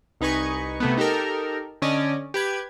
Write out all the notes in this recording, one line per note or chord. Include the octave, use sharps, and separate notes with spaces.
C2 D#4 B4 G#5 C#6
C3 A3 B3
D#4 G4 A4 A#4
D3 C#4 D5 D#5
G4 B4 G#6